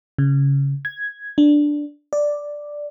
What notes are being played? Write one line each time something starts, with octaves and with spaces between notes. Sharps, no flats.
C#3
G#6
D4
D5